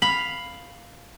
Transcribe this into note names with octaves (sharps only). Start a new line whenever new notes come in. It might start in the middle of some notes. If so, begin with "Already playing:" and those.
F5 B5